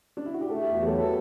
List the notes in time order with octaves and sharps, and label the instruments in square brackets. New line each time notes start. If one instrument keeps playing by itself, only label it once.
[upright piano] D4
E4
F#4
G4
[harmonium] A3 [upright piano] A4
[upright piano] G4
[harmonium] E2
[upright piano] F#4
[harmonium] F#3 [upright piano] G4
[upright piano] A4
[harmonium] A4 [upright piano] B4